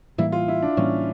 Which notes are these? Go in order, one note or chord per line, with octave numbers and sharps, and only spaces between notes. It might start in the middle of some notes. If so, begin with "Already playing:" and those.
A2 E3 G3 A#3 E4
F4
E4
D4
A2 E3 G3 A#3 C#4